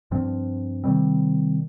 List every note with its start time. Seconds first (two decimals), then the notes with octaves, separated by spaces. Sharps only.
0.11 G2 F3 C4
0.84 C3 D#3 G3 C4